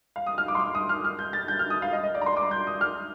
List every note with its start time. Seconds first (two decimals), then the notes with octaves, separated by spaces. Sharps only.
0.16 F5
0.27 D#6
0.38 F6
0.48 D6
0.55 C6
0.60 D6
0.75 D#6
0.89 F6
1.04 F6
1.19 G6
1.33 A6
1.48 G6
1.59 F6
1.70 D#6
1.82 F5
1.93 D#5
2.03 D#5
2.15 D5
2.21 A#5
2.26 C6
2.37 D6
2.51 G6
2.67 D#6
2.81 F6